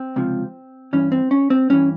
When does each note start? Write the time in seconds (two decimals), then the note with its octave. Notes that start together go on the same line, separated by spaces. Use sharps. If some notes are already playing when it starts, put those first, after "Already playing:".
Already playing: C4
0.16 C#2 C3 F3
0.93 G2 E3 C#4
1.12 C4
1.31 C#4
1.50 C4
1.70 G2 E3 C#4